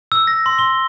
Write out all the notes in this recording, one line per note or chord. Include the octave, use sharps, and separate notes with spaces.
E6
A#6
C6
G7